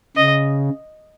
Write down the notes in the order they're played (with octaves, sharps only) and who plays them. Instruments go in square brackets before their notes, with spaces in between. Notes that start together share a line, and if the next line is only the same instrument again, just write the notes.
[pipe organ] C#3 [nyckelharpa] D#5